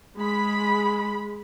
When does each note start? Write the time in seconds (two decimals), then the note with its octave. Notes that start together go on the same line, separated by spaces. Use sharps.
0.17 G#3 B5